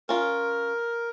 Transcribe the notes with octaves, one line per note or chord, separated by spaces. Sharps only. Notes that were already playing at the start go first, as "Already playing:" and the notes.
C#4 F4 A#4